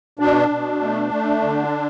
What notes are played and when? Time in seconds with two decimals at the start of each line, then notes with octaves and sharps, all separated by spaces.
0.19 B2 D4
0.49 B2
0.81 A3
1.11 A3
1.42 D3